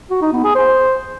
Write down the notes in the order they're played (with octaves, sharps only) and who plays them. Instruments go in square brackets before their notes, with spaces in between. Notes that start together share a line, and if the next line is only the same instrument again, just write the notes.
[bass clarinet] F#4
D#4
B3
G#4
C5